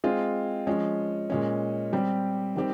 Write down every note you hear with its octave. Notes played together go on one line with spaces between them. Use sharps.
G#3 C4 F4 G#4
F3 G#3 C#4
A#2 G#3 C#4
G3 C4 G4
D#3 G3 C4 G4